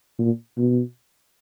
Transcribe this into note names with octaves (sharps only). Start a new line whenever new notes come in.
A#2
B2